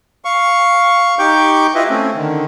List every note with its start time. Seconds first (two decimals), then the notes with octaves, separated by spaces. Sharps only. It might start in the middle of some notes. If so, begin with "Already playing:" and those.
0.25 F5 C#6
1.19 D#4 G4 G5 C#6 D6 G6
1.75 E4 F4 B4 D#5 E5
1.89 A3 C4 C#4
2.16 D3 D#3